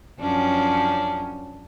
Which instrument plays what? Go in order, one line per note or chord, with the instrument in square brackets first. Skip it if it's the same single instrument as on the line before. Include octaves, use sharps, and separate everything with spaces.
[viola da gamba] F#2 F3 C#4 [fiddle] D4